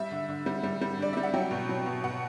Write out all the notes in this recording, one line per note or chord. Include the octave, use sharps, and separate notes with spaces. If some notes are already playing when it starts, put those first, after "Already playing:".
Already playing: G3 E5
D3
D3
G3
G3
G3
D3 D5
G3 E5
F#5
F#3 G5
B2
F#3
B2
B2 F#5